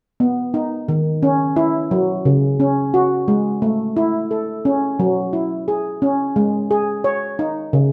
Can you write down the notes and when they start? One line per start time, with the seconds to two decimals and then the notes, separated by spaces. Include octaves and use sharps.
0.20 B3
0.54 D#4
0.88 D#3
1.23 C#4
1.56 E4
1.91 F#3
2.25 C#3
2.60 C#4
2.94 F#4
3.28 G#3
3.62 A3
3.97 E4
4.31 A4
4.65 C#4
4.99 F#3
5.33 E4
5.68 G#4
6.02 C#4
6.36 G#3
6.71 G#4
7.04 C#5
7.39 D#4
7.73 C#3